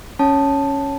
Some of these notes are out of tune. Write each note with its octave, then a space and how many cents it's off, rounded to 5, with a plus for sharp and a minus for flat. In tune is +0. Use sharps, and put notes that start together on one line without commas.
C#4 +0 C#5 +0 A5 +0